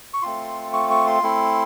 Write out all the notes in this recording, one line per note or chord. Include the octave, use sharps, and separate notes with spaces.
C#6
A3 C4 F4 C6
C#6
C#6
C6
A3 C4 E4